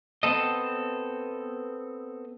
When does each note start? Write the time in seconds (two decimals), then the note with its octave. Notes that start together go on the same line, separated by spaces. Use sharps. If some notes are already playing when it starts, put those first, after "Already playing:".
0.23 B3 C4 A4 D#5